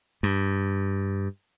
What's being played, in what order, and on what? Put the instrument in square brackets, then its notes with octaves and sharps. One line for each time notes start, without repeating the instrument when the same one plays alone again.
[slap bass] G2